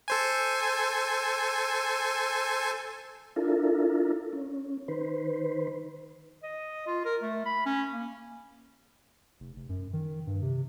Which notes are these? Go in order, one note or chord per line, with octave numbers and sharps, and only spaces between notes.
A4 C5 G#5
D4 E4 F4 A4 A#4
C#4
D#3 B4 C5
D#5
F4
A#4
A3
B5
C#4
A#3
F1
F1
F#2
D#3
G2
C3